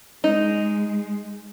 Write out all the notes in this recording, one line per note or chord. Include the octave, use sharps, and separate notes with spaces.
G#3 D#4